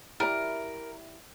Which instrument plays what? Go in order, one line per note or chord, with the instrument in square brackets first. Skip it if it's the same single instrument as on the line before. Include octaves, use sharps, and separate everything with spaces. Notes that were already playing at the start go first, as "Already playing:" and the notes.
[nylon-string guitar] E4 G4 D5 [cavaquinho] A#4